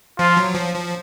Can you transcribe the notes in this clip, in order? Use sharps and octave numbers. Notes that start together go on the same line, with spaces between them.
F3 F4
F#3
F3
F3